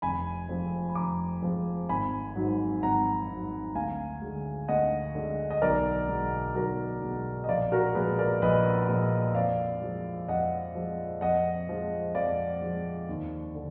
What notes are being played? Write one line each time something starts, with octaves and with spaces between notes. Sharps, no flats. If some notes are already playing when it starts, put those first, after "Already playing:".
F1 G#5 B5
F2 F3 G#3
B5
F1 A#5 D6
F2 F3 G#3
G#1 G#5 B5
G#2 F#3
G#1 F#5 A#5
G#2 F#3
D2 F5 G#5
D3 G#3
D2 D#5 F#5
D3 G#3
D#5
B1 A#4 D5
B2 G#3
B1 F#4 A#4
B2 G#3
D#5
A#1 D5 F5
F#4 A#4
A#2 F3 G#3 G#4 B4
A#4 D5
A#1 B4 D#5
A#2 F3 G#3
F2 D5 F5
F3 G#3
F2 D#5 F#5
F3 G#3
F2 D#5 F#5
F3 G#3
F2 D5 F5
F3 G#3
D#2
D3